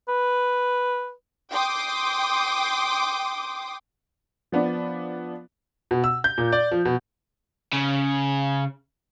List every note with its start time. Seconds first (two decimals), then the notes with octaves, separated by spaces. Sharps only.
0.08 B4
1.51 G5 C6 D6 D#6
4.52 F3 B3 D4
5.91 B2
6.04 E6
6.24 G6
6.38 A#2
6.53 D5
6.72 F3
6.85 B2
7.73 C#3